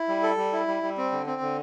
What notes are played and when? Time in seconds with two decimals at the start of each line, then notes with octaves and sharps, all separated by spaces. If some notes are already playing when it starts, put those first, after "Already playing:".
Already playing: E4
0.08 G3
0.23 A4
0.37 G3
0.53 E4
0.67 G3
0.83 G3
0.98 C4
1.12 D3
1.27 C4
1.41 D3